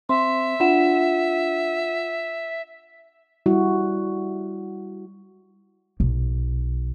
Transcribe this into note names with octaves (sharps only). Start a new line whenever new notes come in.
C4 E5 C6
D4 F4 F#5 E7
G3 E4 F#4
B1